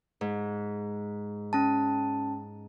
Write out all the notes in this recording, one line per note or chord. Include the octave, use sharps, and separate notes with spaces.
G#2
C#4 A5